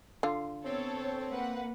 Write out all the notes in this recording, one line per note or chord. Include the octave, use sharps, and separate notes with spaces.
D3 F4
B3 C4 A4 C#5
A#3 B4 F#5